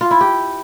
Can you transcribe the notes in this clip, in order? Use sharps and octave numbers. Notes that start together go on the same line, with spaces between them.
F4
E4
G4